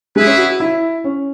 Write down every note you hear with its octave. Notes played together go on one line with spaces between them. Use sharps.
G#3 E4 G#4 B4 E5
C#4
F#4
E4
C#4